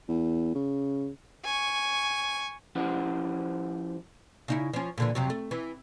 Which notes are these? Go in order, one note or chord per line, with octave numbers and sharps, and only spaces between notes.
E2
C#3
G#5 C#6
F3 C#4 E4 G4 C5 F#5
C#3 D#4 E4
F3 C#4
A#2 D3 E3
F2 C3 F#3
A3
E3